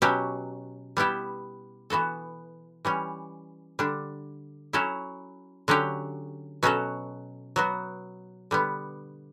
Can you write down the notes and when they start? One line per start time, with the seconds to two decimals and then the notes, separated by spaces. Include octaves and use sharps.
0.02 B2 F#3 C#4 G4
0.97 G3 B3 E4 G4
1.90 E3 B3 F#4 A4
2.85 E3 G3 C#4
3.79 D3 G3 D4
4.73 F#3 C#4 E4 A4
5.68 D3 F#3 C#4 G4
6.63 B2 F#3 C#4 F#4 A4
7.56 F#3 B3 F#4
8.51 D3 G3 B3